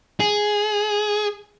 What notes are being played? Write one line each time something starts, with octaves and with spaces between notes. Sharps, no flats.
G#4